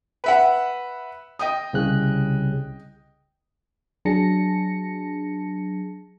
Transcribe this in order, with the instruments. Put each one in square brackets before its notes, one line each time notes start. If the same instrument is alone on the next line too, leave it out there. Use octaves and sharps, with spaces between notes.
[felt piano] B4 E5 F#5
D#5 G5 D#6
[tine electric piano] C2 C#3 F#6
[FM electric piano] F#3 D4 G#4 A5 A#6 C#7